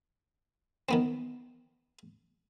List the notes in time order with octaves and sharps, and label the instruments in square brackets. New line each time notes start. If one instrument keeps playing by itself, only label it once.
[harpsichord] D#3 B3 C4